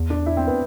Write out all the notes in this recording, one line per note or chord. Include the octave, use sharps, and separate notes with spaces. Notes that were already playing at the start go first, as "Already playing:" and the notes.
Already playing: E2
D4
E4
C4
B3